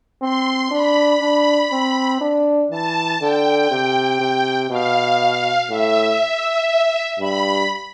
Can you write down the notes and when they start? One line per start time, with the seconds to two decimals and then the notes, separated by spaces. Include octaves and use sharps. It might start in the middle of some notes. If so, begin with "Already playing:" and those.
0.22 C4 C6
0.71 D4 B5
1.21 D4
1.72 C4
2.21 D4
2.70 E3 A5
3.21 D3 G5
3.71 C3
4.21 C3
4.70 B2 F5
5.70 A2 E5
7.20 G2 B5